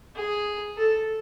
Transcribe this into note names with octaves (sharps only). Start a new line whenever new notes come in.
G#4
A4